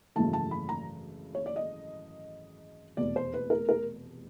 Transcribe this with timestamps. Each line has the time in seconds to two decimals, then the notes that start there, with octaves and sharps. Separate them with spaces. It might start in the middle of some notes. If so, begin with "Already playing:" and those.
0.16 G#1 F#2 C#3 E3 A3 A5
0.33 A5
0.51 B5
0.69 A#5
1.35 C#5
1.46 D5
1.56 D#5
2.97 F1 E2 B2 D5
3.16 C5
3.34 B4
3.50 A#4
3.69 A#4